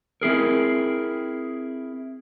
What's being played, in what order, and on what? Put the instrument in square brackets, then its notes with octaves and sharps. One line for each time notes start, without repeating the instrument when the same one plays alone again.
[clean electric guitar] C4 E4 G#4 A#4